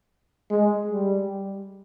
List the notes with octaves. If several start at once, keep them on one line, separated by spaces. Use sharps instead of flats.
G#3
G3